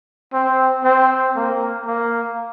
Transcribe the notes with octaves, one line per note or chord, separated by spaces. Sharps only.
C4
C4
A#3
A#3